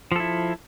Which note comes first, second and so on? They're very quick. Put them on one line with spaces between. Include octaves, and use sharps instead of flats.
F3 A4 E4